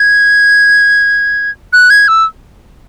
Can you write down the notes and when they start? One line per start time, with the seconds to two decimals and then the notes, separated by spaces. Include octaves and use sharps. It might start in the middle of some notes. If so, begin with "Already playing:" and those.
Already playing: G#6
1.73 F#6
1.90 G#6
2.08 E6